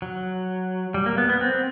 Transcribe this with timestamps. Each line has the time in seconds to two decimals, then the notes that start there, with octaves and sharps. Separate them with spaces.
0.02 F#3
0.94 G3
1.06 A#3
1.18 B3
1.30 B3
1.41 C4